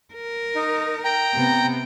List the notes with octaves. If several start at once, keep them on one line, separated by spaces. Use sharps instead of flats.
A#4
D#4
G5 A#5
C3 B3